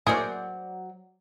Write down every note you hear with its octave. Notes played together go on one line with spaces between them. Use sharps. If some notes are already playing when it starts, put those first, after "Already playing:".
A2 F#3 A#3 G#4 C5 D5 C#6